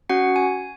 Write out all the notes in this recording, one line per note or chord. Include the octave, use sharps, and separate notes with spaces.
C#4 F#4 F#5
G#5